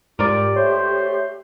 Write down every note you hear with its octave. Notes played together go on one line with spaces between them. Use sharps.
G#2 F4 G4 A#4 D5 D6
A3 C5 C#5 C6